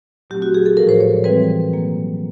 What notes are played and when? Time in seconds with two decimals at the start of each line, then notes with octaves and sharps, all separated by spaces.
0.30 A#2 F#3 A3 C4 G4
0.42 F#4
0.54 G#4
0.66 A4
0.77 A2 F3 G#3 A#4
0.89 C5
1.01 C#5
1.24 E3 G3 C4 B4
1.71 B2 F#3 A#3